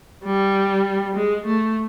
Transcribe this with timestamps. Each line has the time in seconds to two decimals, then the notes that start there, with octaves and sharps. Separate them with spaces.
0.24 G3
1.16 G#3
1.46 A3